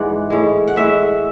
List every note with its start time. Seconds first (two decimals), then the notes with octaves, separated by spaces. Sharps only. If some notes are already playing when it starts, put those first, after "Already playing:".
Already playing: G#2 E3 G#3 D5 F#5
0.30 A2 G#3
0.67 F#5
0.76 A2 G#3 E5